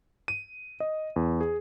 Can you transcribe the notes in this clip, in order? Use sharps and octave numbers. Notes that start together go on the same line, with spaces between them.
D#7
D#5
E2
G#4